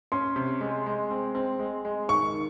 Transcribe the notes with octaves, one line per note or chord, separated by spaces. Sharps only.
C#4 C6
C3
G#3
G#3
C4
C4
G#3
G#3
D#3 C#6
D#3